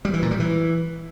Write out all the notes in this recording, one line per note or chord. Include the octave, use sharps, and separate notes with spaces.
G3
E3
A#2
G3
E3